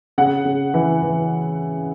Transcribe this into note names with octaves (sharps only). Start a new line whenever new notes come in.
C#3 F#5
C#3
E3
E3